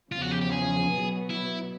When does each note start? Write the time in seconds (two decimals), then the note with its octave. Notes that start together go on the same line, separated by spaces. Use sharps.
0.12 E2 C#3 F3 F4
0.21 F#4
0.31 G4
0.41 G4
0.51 G#4
0.91 B2 F#3 B3
1.30 E4